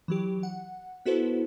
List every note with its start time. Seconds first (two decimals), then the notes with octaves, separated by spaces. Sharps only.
0.08 E3 F#3 G4
0.43 F#5
1.05 B3 E4 F#4 A4 B4 C5